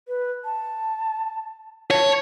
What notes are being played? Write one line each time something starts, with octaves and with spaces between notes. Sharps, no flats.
B4
A5
C#5 A5